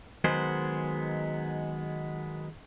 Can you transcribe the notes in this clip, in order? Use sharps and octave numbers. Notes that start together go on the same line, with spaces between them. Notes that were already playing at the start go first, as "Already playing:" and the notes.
D#3 F#3 G#3 B3 G#4 C5